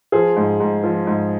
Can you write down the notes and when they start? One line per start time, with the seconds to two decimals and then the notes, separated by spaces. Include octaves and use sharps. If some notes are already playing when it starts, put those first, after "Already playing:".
0.12 F3 G#4 C5
0.36 G#2
0.60 G#2
0.84 F3
1.07 G#2